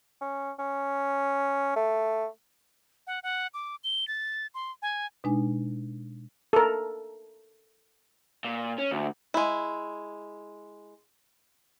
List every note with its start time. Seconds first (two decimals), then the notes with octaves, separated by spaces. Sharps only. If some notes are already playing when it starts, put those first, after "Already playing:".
0.21 C#4
0.59 C#4
1.76 A3
3.07 F#5
3.23 F#5
3.54 D6
3.84 G7
4.08 A6
4.54 C6
4.82 G#5
5.24 B2 G#3 D4 D#4 G#5
6.53 A4 A#4
8.44 A#2
8.79 C#4
8.91 D2
9.34 G#3 E4